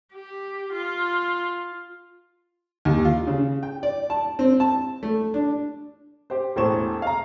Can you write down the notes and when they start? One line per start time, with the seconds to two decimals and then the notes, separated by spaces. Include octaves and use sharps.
0.14 G4
0.73 F4
2.85 D#2
3.05 F4
3.27 C#3
3.63 G5
3.83 D5
4.10 A5
4.39 C4
4.60 A5
5.03 A3
5.34 D4
6.30 G4 C5
6.56 E1 A2 G4 C5 C#6 E7
7.02 F5 A#5